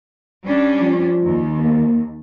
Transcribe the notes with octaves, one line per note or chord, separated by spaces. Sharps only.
G3 C#4 D4
F3
D#2
A#3